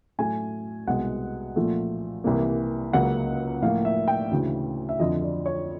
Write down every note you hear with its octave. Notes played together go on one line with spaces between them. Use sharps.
A2 F#3 A3 G#5
C2 B2 G#3 F#5
A#2 F3 A3
C2 C3 E3 G3 A#3
C#2 C#3 F#3 A#3 F#5
A2 F3 A#3 F5
E5
G5
D2 C#3 E3
E5
F2 D3 F3 D#5
D5
C#5